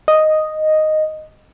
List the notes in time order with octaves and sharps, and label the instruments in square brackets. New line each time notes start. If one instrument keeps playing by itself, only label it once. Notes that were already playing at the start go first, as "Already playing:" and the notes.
[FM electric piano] D#5